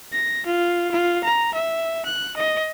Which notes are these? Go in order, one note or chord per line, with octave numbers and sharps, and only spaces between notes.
A#6
F4
F4
A#5
E5
F#6
D#5